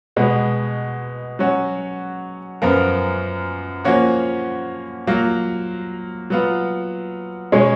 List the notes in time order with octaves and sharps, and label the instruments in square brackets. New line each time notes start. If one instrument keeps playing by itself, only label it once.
[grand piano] B2 G#3 B3 F#4
F#3 C#4 F#4
F#2 F3 B3 F4 A#4
F3 A#3 C#4 F#4
F#3 A#3 F4
F#3 B3 F4
B2 G#3 C#4 G#4 C#5